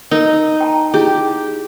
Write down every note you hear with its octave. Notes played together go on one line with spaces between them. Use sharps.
D#4 A#4
G5 A5 A#5
E4 G4 G#4